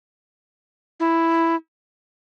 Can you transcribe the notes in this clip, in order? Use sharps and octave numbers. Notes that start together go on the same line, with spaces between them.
E4